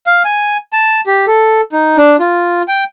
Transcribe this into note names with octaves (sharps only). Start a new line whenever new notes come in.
F5
G#5
A5
G4
A4
D#4
D4
F4
G5